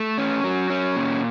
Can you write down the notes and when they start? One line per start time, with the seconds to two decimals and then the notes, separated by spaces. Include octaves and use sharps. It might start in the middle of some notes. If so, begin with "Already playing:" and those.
Already playing: A3
0.18 C#4
0.44 F#3
0.70 C#4
0.96 A#2